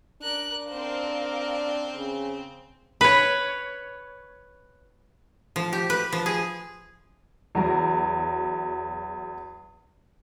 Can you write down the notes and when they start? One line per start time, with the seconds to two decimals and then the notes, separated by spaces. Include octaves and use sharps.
0.22 D4 A#4 F#6
0.70 C4 A#4 C5 F5
1.95 C#3
3.01 B4 C#5
5.56 F3
5.73 G4
5.90 B4
6.12 F3
6.26 G#4
7.55 E2 F#3 A#5